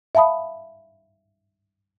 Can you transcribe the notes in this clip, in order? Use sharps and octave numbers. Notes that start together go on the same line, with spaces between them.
E5 F5 A5 B5 D#6